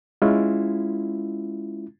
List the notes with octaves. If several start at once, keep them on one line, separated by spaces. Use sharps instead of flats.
G#3 C#4 E4 F4